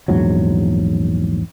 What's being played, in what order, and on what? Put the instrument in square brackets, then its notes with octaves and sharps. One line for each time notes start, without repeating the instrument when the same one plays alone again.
[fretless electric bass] A#1 E2 G#2 F#3